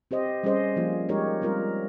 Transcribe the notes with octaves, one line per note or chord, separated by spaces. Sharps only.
C4 G4 C5 D#5
G3 C#4 G#4 C5 D#5
F3 A#3 F4
G#3 D#4 G4 A#4 C#5
G3 C4 F4 A#4